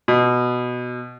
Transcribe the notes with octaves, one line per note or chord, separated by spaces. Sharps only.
B2